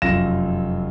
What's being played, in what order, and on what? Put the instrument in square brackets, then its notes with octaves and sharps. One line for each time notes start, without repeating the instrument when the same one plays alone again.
[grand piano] F1 F#2 F4 A#6 E7